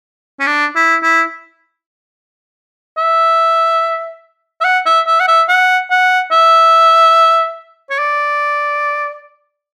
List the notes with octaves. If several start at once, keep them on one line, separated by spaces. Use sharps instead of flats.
C#4
D4
E4
E4
E5
E5
F#5
E5
E5
F#5
E5
F#5
F#5
E5
C#5
D5